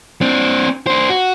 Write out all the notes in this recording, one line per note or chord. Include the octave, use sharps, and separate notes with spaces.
C4 D4
D4 C5
F#4